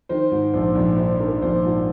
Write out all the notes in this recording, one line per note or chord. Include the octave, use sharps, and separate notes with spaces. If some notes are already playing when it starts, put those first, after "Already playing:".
D#3 C5
G#2
A#1 C5
A#1
D#3 C5
D#3 A#4
A#1 C5
G#2 F4